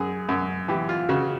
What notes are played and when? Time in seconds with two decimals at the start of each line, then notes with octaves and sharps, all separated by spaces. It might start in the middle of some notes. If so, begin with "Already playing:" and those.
Already playing: F#2 G#4
0.29 F#2
0.68 E3 G4
0.89 F4
1.09 C#3 F#4